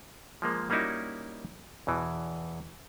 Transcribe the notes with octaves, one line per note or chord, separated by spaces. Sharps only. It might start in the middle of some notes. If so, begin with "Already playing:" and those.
F3 G#3 A#3
G3 A#3 C#4 D#4 E4 F#4
E2 B2 E3